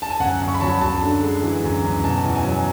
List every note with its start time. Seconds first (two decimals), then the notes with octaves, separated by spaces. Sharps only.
0.02 A5
0.11 G#5
0.20 F#2 F#5
0.42 F#2
0.48 C#6
0.54 B5
0.61 F#3 A5
0.81 F#2 A5
1.03 D3
1.23 G#3
1.43 E3
1.64 F#2
1.84 F#2
2.04 B2 A5
2.25 E2
2.35 G#5
2.45 F#3